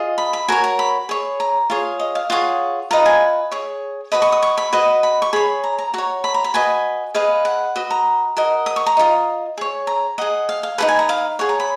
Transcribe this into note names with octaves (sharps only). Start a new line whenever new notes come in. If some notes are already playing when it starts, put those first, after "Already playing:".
Already playing: F4 G#4 D#5
B5
B5
F#4 A#4 C#5 G#5
A#5
B5
G#4 C#5
A#5
F4 G#4 C#5 F5
D#5
F5
F4 G#4 C#5 F#5
F4 B4 D#5 A#5
G#5
G#4 C#5
F#4 B4 D#5 B5
C#6
D#6
C#6
B5
F#4 B4 D#5 B5
B5
C#6
G#4 C#5 B5
A#5
A#5
F#4 C#5 A#5
B5
A#5
B5
F#4 B4 D#5 G#5
G#4 B4 D#5 F5
F#5
F#4 B4 D#5
A#5
F#4 A#4 D#5
D#6
C#6
A#5
F4 A#4 D#5
G#4 C#5
A#5
G#4 D#5 F#5
F5
F5
D#4 G#4 B4 F#5
G#5
A#5
F5
G#4 C#5 F#5
A#5
B5